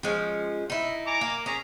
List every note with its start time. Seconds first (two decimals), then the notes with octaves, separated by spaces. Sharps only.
0.03 F3 G#3 C#4
0.70 D#4 E4
1.07 G#5 A#5 D6
1.21 A#3
1.46 C#4 G#4 A#5